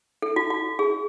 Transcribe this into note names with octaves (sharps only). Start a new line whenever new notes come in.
A4
F#4
F#4
G#4